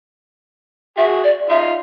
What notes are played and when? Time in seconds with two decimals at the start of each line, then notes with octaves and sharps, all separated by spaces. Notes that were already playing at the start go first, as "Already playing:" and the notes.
0.98 F#4 G#4 E5
1.24 D5
1.50 D#4 F4 E5